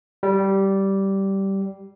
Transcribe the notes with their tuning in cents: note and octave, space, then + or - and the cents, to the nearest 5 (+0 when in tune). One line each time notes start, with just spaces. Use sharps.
G3 -15